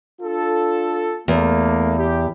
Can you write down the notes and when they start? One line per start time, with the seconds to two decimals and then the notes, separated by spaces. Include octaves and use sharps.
0.22 D4 F4 A4
1.28 E2 A3 A#3
1.97 G4